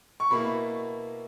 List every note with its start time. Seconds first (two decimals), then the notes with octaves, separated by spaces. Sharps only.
0.20 C#6
0.31 B2 A#3 E4 B5